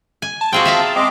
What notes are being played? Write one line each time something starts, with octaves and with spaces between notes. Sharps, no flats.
G#5
A5
C4 F4 F#4 G#4 G5
E5 F5 A#5
G#3 C4 D#5 D6